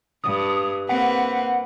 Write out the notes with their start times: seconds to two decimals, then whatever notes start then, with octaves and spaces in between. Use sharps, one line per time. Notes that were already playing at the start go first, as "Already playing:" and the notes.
0.24 G2 D#6
0.89 A#3 C4 B4 F#5